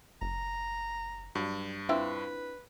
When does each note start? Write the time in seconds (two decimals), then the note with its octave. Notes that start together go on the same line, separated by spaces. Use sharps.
0.22 F#1 A#5
1.35 G2 F#3
1.89 C4 D4 E4 F4 B4